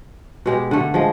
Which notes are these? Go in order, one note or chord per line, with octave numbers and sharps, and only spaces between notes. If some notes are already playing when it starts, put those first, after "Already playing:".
B2 G#3 G4
D3 A3
F3 G#3